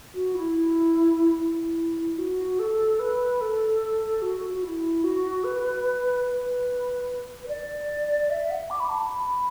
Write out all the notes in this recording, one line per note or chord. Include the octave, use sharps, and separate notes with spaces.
F#4
E4
E4
F#4
A4
B4
A4
F#4
F#4
E4
F#4
B4
B4
B4
D5
E5
F#5
D6
B5
A5
B5